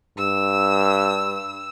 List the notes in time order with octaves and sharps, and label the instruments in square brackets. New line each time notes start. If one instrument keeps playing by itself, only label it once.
[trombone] G2 [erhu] E6